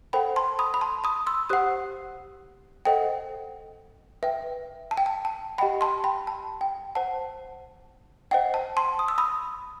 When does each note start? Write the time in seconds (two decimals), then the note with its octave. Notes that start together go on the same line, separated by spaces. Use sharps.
0.13 A4 C5 F#5 G5 B5
0.36 A5 C6
0.59 B5 D#6
0.74 B5
0.81 A5 C6
1.04 B5 D#6
1.27 C6 E6
1.49 G4 C5 F#5 D#6 F#6
2.85 A4 C5 D#5 F#5 G5
4.23 B4 E5 G5
4.91 A5
4.97 G5
5.06 A5
5.25 A5
5.58 G4 D#5 F#5 G5 B5
5.81 A5 C6
6.04 G5 B5
6.27 A5
6.61 G5
6.95 C5 F#5 A5
8.31 C5 D#5 F#5 G5
8.54 A5
8.77 A5 C6
8.99 D#6
9.08 E6
9.18 B5 D#6